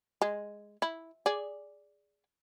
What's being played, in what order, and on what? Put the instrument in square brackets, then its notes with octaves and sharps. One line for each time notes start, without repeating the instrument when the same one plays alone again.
[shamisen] G#3
E4
G#4 D5